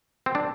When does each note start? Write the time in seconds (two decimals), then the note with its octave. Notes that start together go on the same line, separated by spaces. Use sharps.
0.26 C4
0.35 D4